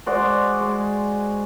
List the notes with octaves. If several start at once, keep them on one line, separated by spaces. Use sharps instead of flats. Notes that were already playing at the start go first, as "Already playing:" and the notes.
G#3 F#4 C5 D5
G#3